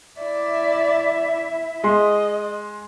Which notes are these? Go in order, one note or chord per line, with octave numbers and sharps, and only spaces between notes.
E4 D5 E5
G#3 D#5 C6